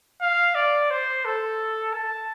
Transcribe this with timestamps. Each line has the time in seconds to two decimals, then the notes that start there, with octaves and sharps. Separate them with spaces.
0.21 F5
0.55 D5
0.90 C5
1.25 A4
1.94 A5